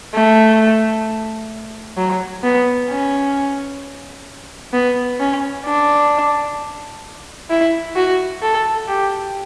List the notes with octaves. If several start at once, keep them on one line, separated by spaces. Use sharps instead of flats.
A3
F#3
B3
C#4
B3
C#4
D4
E4
F#4
A4
G4